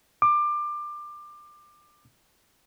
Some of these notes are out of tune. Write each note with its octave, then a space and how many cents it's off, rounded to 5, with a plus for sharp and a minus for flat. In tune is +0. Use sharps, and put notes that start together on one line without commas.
D6 +25